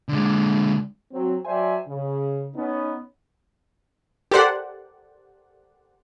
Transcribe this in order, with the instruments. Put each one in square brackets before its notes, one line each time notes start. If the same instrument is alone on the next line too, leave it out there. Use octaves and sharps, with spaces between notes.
[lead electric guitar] D3 G#3
[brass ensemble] F#3 C4
F#3 C5 D5 E5 G5 G#5
C#3
B3 C#4 D#4
[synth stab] G4 A4 A#4 C5 D5 F#5